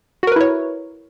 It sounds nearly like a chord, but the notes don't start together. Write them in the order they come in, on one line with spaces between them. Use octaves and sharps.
F#4 A#4 B4 E4 C#5